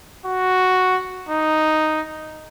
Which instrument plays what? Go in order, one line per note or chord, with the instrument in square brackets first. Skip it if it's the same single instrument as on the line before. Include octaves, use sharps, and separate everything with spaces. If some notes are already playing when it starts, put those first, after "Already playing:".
[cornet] F#4
D#4